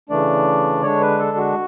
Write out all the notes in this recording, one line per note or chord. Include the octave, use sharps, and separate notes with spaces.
C#3 E3 A3 D4 D5
D3 G#3 D4 C#5
B4
A4
F#4